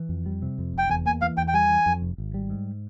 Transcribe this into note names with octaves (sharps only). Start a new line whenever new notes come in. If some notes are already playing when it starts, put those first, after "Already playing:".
Already playing: E3
F2
G3
C3
F2
F1 G5
E2 G#5
A#3 G#5
E3 F5
E2 G5
G5
G3 G#5
E3
F2
F1
G#1
G3
G#2